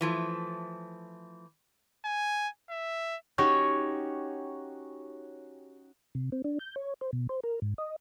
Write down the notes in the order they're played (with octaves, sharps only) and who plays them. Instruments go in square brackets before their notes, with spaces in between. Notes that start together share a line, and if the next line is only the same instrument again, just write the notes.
[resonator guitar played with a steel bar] E3 F3 A3
[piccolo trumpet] G#5
E5
[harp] C#4 D#4 F#4 G4 C#5
[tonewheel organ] C3
C4
D4
G6
C#5
C5
B2
C5
A#4
G#2
D#5